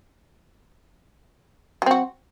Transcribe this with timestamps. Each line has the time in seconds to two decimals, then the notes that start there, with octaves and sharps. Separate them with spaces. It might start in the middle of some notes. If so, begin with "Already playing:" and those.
1.82 F#3
1.86 C4
1.91 F#4